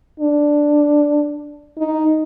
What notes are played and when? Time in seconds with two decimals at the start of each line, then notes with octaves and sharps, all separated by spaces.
0.20 D4
1.78 D#4